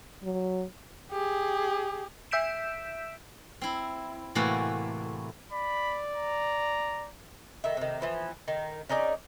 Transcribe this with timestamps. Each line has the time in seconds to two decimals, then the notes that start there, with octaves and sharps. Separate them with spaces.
0.23 F#3
1.11 G4 G#4
2.31 E5 E6 G6 B6 D7 E7
3.61 C4 E4
4.35 A2 C3 E3 A3 A#3 F#4
5.52 D5 B5
6.14 A#5
7.64 D#3 E5
7.77 C3 D#3
8.01 E3 F3 B3
8.48 D#3
8.89 C#4 D#4 G#4 D5